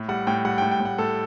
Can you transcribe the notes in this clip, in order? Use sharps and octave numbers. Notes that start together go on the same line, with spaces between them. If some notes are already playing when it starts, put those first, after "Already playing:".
Already playing: A2
G3 F#5
A2 G5
G3 F#5
G5
A2
G5
A2
F#5
A2 A4